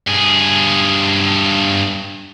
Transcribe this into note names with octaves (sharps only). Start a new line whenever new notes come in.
G2 G#4